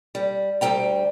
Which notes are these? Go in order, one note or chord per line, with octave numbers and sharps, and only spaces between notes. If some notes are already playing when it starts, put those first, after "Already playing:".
G3
D2 E3 G3 G5 A#5